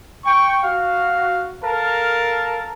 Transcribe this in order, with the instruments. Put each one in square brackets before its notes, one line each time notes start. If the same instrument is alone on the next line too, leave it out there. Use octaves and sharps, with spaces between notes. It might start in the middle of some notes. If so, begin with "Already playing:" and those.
[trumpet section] G5 C#6
F#4 F5
A4 A#4 F5 A5